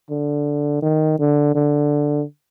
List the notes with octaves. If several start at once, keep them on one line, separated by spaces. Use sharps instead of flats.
D3
D#3
D3
D3